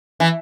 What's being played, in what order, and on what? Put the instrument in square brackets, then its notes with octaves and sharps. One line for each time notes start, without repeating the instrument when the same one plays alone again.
[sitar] E3